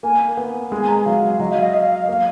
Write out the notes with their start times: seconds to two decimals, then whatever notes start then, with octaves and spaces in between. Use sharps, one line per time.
0.03 A#3 G#5
0.37 B3
0.72 G#3
0.80 G#5
0.88 A#5
1.05 F#3 F5
1.40 F#3 D#5
1.51 F5
1.63 D#5
1.74 F5
1.91 F5
2.08 A#3 F5